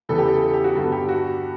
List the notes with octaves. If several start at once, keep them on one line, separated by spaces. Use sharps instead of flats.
E2 C#3 E3 G3 B3 A4
G4
A4
A4
G4
F#4
G2 D3 F#3 B3 A4
G4
F#4